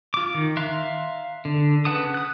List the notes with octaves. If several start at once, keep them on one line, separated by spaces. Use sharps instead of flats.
F4 D6
D#3
E5 F5 A#5 C6 F#6
D3
C#3 B4 F#5 A5 D#6
D#6 F#6